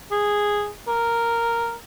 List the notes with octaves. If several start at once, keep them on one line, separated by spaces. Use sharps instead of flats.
G#4
A#4